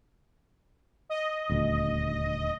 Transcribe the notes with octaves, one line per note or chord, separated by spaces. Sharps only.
D#5
D#1 D2